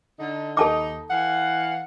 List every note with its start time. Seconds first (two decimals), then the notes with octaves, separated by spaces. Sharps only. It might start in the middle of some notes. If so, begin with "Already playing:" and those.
0.20 D3 D#4
0.57 D#2 D#4 A4 A5 D6
1.10 E3 F5 F#5